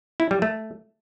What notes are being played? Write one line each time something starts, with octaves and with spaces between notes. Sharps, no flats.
E4
G3
A3